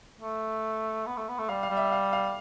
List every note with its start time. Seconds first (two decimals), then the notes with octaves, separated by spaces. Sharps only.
0.21 A3
1.06 B3
1.17 A3
1.28 B3
1.38 A3
1.49 G3 F5
1.63 F5
1.70 G3
1.77 E5
1.92 F5
2.13 F5